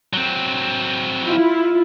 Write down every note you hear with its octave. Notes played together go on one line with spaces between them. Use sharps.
F#3 C4
E4 F4